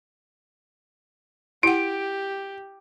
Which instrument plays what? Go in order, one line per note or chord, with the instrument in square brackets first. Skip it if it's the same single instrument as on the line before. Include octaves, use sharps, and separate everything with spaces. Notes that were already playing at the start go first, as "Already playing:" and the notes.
[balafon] E4 F#5 [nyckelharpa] G4 [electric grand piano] D7